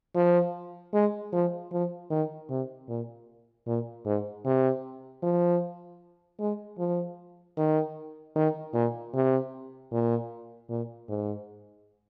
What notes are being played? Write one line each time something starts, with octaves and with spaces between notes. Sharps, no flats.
F3
G#3
F3
F3
D#3
C3
A#2
A#2
G#2
C3
F3
G#3
F3
D#3
D#3
A#2
C3
A#2
A#2
G#2